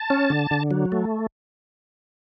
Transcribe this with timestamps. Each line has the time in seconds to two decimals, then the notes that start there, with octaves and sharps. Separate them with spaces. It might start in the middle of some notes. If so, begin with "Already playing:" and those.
Already playing: A5
0.10 C#4
0.30 D3
0.51 D3
0.71 F#3
0.92 A3